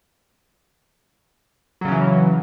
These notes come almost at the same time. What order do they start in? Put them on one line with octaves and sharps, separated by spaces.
F#3 C#3 C#4 E3